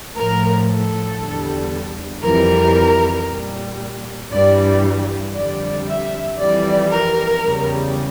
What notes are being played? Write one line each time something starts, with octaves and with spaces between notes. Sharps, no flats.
A2 F3 A#4
A4
E2 D3 G3
F2 E3 G3 A#4
A#2 G3
G2 E3 G3 D5
F2 D3 G3 D5
E5
F2 E3 G3 D5
A#4
E2 C#3 G3